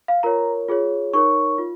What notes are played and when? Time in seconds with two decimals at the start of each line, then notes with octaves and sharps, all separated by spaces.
0.08 F5
0.23 F4 A#4 C#5 A#5
0.69 F4 G#4 C#5
1.13 D#4 A#4 C#5 C#6
1.58 F4